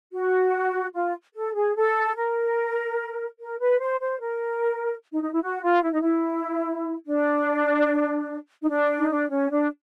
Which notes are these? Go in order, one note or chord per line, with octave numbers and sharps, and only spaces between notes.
F#4
F4
A4
G#4
A4
A#4
A#4
B4
C5
C5
A#4
D#4
D#4
E4
F#4
F4
E4
D#4
E4
D4
D#4
D4
D#4
D4
C#4
D4